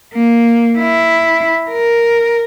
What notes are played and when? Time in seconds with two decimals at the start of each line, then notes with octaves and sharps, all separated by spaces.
0.14 A#3
0.78 E4
1.71 A#4